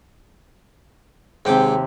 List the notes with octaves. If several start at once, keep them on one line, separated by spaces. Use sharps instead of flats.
D#2 G#2 C3 G5 D6